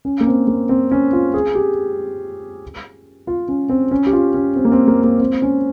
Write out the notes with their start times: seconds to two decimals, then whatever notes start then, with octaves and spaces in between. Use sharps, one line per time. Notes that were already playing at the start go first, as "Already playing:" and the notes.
0.05 C#4
0.21 A#3
0.27 C4
0.48 A#3
0.69 C4
0.91 C#4
1.13 F4
1.34 G#4
1.55 G4
3.27 F4
3.48 C#4
3.69 C4
3.91 C#4
4.06 G4
4.13 F4
4.34 C#4
4.56 C4
4.65 A#3
4.72 C4
4.88 A#3
5.04 A#3
5.20 C4
5.42 C#4